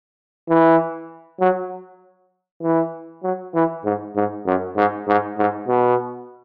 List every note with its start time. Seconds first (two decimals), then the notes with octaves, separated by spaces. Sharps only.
0.49 E3
1.40 F#3
2.62 E3
3.23 F#3
3.55 E3
3.85 G#2
4.16 G#2
4.46 F#2
4.76 G#2
5.07 G#2
5.38 G#2
5.68 B2